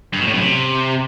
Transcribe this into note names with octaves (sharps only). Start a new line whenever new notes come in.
G2
B2
A2
F#2
C3